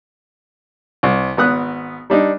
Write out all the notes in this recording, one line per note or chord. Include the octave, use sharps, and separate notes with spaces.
C2
G#1 B3 D#6 F#6
G3 D4 D#4